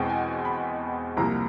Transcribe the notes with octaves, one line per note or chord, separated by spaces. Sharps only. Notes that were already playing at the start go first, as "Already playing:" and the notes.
Already playing: E2 B2 G#3 C4 G5
G#5
B5
C2 C3 F3 A#3 A#5